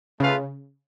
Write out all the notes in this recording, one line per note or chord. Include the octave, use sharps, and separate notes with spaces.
C#3 A3 F4 B4 F5